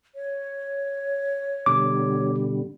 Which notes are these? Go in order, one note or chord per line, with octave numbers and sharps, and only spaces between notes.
C#5
B2 D3 G3 D6